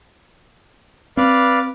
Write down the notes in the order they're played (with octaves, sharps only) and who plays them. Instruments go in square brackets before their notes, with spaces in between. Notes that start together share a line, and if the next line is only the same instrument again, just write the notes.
[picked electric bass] C4 [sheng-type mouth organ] B4 D5 F5